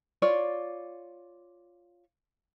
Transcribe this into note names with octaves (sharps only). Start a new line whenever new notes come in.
F4 C#5 D5